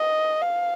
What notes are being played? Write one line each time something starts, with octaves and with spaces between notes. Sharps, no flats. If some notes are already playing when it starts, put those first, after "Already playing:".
Already playing: D#5
F5